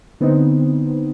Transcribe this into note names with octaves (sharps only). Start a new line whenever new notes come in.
D3 B3 C4 D#4